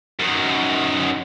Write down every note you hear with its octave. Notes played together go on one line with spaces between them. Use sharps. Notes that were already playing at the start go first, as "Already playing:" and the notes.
F#2 D#3